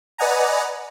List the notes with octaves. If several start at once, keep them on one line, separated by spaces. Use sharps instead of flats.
B4 D5 D#5 F#5 G#5 A#5